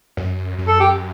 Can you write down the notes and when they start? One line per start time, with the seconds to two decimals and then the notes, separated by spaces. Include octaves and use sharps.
0.17 F#2
0.58 F#2
0.68 A4
0.80 G4